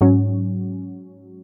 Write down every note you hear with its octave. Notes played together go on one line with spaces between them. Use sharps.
G#2 F#3 C#4